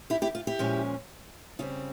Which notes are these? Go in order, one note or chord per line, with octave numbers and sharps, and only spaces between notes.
E4 G4
E4 G4
F4
E4 G4
A#2 F3 G#3 C#4
C#3 G3 C4 F4